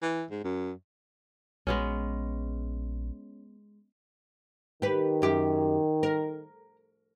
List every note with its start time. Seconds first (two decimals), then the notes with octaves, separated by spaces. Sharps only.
0.02 E3
0.31 G#2
0.44 F#2
1.67 A#1 G#3 B3 C#4
4.82 D#3 G4 B4
5.22 F#2 G4
6.03 A#4